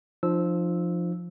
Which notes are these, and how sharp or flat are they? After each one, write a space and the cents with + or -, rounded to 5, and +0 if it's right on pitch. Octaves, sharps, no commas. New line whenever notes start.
F3 +0 D#4 -45 E6 -10